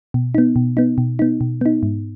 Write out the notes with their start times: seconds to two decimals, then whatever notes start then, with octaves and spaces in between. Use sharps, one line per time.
0.14 B2
0.35 B3 D#4
0.56 B2
0.77 B3 D#4
0.98 B2
1.19 B3 D#4
1.41 B2
1.61 B3 D#4
1.83 G#2